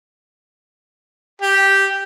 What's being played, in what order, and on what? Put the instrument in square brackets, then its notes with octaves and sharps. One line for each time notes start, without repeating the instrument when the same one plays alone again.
[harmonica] G4